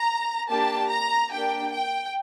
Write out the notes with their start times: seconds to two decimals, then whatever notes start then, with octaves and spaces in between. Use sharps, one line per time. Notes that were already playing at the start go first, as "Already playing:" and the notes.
Already playing: A#5
0.50 A#3 D4 G4 A5
0.90 A#5
1.31 A#3 D4 G4 G5
1.72 G5